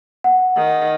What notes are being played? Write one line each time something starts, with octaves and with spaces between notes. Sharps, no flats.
F#5
D#3